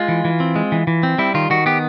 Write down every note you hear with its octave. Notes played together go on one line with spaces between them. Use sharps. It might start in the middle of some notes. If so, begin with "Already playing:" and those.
Already playing: G#3 F4
E3
E3
C4
G#3
E3
E3
C4
G3 E4
D#3 F4
D#3 F#4
B3 G4